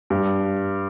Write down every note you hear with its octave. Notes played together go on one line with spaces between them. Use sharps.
G2